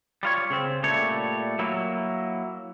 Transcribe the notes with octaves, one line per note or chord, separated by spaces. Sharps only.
G3 F4 C#5
C#3 C4
A#2 G3 A3 C#5
F#3 A#3 E4